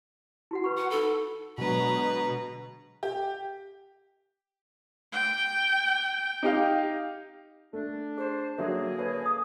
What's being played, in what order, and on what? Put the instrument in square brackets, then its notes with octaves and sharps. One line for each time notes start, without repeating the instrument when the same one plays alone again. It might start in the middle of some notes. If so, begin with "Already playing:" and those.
[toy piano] E4 F#4 F#5
B4 B5 C#6
[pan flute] F#5
[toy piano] D#4 B5 [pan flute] A4
[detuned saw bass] B2 [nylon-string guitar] D3 F#3 G#3 [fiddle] B4 A#5
[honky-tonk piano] G4
[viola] G5
[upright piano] D#4 G4 F5
[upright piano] A3 [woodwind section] D4
[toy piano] G#4 [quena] C5
[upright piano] D3 F#3 F#4 [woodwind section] A#3 [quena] G#4 [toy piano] A#4 E5
[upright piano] A4 B4 C#5
[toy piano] D#6